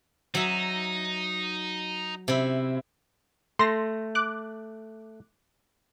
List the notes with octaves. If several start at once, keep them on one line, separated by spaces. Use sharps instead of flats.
F#3 D#4 E5
C3 E4
A3 C6 A#6
D6 F#6